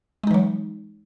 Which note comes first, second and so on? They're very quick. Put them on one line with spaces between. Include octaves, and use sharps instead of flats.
G#3 D#4 E3 F#3